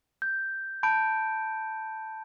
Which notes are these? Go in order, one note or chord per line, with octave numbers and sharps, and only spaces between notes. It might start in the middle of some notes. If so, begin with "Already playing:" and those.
G6
A5 B5 G6 D7